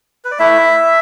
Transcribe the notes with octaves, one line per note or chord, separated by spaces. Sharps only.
B4
D5
A3 E4 E5